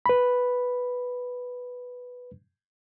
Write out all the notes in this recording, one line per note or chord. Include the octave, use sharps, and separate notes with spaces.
B4 B5